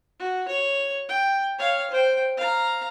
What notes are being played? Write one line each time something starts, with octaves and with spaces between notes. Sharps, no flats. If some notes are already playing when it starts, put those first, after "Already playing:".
F#4
C#5
G5
C#5 F5
C5 G5
F5 A#5